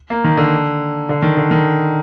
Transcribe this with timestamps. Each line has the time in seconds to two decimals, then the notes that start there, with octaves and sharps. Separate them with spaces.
0.10 A#3
0.24 D#3
0.37 D3
1.09 D3
1.22 D#3
1.37 D3
1.51 D#3